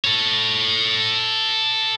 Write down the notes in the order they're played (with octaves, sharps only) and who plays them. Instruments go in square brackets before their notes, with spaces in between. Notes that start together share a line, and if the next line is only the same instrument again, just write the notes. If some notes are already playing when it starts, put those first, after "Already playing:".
[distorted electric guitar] A4 C#5